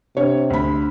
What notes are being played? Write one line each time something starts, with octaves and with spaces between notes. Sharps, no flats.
C3 D4 C#5
D2 B5